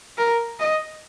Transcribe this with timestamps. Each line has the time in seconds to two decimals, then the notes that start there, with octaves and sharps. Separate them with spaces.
0.18 A#4
0.59 D#5